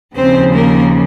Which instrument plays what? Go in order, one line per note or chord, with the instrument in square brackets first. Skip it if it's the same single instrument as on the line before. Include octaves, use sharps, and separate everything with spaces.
[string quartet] D#2 C#3 F3 C4 C5
A#3 A#4